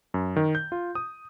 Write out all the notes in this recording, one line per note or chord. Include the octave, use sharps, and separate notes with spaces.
F#2
D#3
G6
F4
D#6